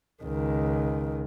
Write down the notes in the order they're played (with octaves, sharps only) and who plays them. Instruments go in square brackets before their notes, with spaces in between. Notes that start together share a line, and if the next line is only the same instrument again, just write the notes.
[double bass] C#2 D#3